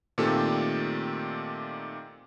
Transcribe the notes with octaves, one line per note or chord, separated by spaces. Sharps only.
A#2 D#3 A3 C4 G4 A4